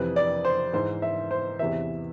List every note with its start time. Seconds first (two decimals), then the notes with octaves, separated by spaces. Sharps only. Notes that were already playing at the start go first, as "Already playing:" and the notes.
Already playing: F2 C3 E3 B4
0.16 D5
0.45 C5
0.73 G#2 E3 C5
1.02 E5
1.31 C5
1.59 E2 C3 E3 E5